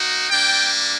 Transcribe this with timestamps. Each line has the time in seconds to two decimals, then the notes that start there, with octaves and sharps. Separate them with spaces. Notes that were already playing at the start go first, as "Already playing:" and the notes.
Already playing: A#3 D#4 F#4
0.29 G3 A#3 D4 G5